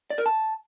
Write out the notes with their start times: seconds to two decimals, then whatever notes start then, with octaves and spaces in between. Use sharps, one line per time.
0.10 D5
0.18 A#4
0.26 A5